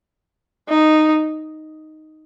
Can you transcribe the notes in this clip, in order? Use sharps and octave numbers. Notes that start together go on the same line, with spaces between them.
D#4